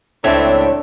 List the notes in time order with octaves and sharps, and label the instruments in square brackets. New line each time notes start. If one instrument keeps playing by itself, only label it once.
[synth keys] C#2 C4 E5 [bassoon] A2 [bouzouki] F#3 A3 C#5 [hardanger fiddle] D4